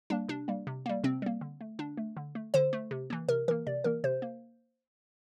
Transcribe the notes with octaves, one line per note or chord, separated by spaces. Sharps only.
G3 A#3 D4
C3 D4
G3 A#3
C3
G3 A#3
C3 C4
G3 A#3
D3
A3
D3 D4
A3
D3
A3
D3 C5
A3
C3
E3 A#3
C3 A#4
E3 A#3 A#4
C3 D5
E3 A#3 A#4
C3 C5
A#3